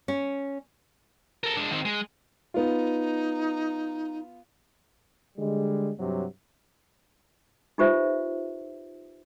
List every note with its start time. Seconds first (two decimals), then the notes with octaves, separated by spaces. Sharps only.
0.08 C#4
1.44 A4 A#4
1.57 G#3 D4
1.71 D#3 C4
1.85 G#3
2.54 B3 D#4 F4
5.37 D3 G3 G#3
5.98 G2 C3 F#3
7.78 D#4 F4 G4 B4 C5 E5